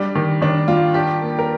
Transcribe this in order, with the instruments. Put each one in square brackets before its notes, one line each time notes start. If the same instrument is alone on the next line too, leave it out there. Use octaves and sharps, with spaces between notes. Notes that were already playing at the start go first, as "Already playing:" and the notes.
Already playing: [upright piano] G3 [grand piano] D4
[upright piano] D#3
[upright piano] D#3 [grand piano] D4
[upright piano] G3 [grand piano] F4
[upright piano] D4 [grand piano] G4
[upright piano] A#3
[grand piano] A#4